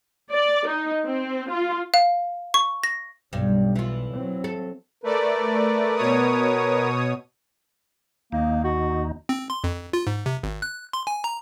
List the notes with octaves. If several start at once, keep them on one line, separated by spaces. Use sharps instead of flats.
D5
D#4
C4
F4
F5
C#6
A#6
B1 G2
E3 F4
F#3 C4
A4
A3 A#4 B4 D5
B2 C#5 D#6
D#2 A#3 D#4
F#4
C4
C6
F2
F4
G#2
C3
G#1
F#6
C6
G#5
A#5